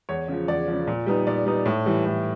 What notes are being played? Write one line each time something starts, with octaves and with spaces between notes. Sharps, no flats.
E2 C#5
C#3 F3
E2 D5
C#3 F3
A#2
G3 B3 D#4
A#2 D5
G3 B3 D#4
A2
E3 G3
A2